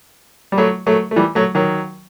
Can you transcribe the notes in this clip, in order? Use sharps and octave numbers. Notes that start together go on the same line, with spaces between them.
G3
F#3 A3
F#3 A3
A3
E3 G3
F#3 A3
D#3 F#3